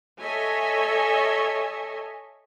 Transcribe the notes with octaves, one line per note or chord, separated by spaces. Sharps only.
A4 C#5 D#5 E5 G#5